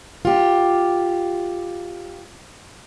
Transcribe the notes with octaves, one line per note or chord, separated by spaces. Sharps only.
F4 G4